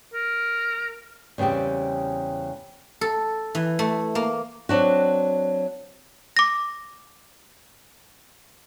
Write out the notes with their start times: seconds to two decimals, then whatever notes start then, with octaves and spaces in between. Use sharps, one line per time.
0.14 A#4
1.38 E2 C#3 G3 C4 G4
3.01 A4
3.55 E3
3.79 A3
4.15 A#3
4.69 F#3 C4 D4 F#4
6.37 D6 A#6